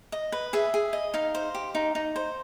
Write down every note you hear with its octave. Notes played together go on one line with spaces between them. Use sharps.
D#5
B4
G#4 E5
G#4
D#5
D#4 F5
C5
G4
D#4
D#4
C5